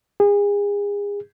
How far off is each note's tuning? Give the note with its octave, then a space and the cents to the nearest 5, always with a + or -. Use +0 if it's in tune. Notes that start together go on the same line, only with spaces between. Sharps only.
G#4 -35